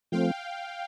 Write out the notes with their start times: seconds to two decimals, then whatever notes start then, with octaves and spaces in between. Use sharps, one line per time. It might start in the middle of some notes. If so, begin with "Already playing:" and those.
0.12 F3 A3 C4 F5 G5